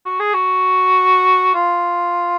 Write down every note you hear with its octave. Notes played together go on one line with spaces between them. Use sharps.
F#4
G#4
F#4
F4